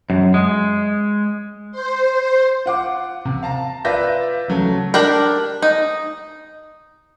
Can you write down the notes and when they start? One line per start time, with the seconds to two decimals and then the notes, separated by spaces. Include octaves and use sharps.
0.10 F#2
0.34 G#3
1.72 C5
2.66 F4 F#5 D6
3.25 C3
3.43 F5 A5 A#5
3.85 F4 B4 D5 E5 G6 A#6
4.48 C#3 F#3 A3
4.94 D4 G4 A#4
5.62 D#4